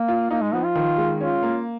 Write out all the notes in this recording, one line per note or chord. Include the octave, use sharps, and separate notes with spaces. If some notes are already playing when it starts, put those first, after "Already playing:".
Already playing: A#3
F4
A#3 D#4
G#3
F3 B3
F4
D#3
G#3
C#4 F4
A#3